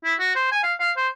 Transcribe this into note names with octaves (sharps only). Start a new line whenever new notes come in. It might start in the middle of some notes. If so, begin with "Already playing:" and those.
E4
F#4
C5
G#5
F5
F5
C5